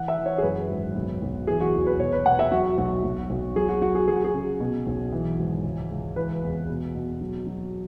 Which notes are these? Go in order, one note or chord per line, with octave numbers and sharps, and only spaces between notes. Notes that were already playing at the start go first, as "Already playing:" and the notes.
Already playing: E3 F#5
E5
E3
C#5
G#4
F#2 B4
G#1
B1
B1
E3 G#4
F#4
E2
B4
B2 C#5
B4
B2 F#5
E5
F#3 F#4
B1 F#4
B1
B1
F#3 G#4
F#4
F#3 F#4
G#4
F#3 G#4
F#4
G#4
C#3
B2
B1
E3
G#1
C#2
C#2
E3 B4
E2
B2
B2
F#3
F#3